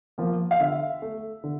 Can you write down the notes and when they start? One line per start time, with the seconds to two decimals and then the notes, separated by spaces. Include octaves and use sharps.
0.18 F3 A#3
0.51 F5
0.60 D3 E5
1.02 A3
1.44 D3